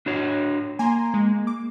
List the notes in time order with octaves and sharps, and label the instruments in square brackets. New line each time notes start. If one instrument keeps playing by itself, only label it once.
[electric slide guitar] D4 F#4 C#5
[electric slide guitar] A#3 [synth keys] G#5 A#5 C6
[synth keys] G#3
D6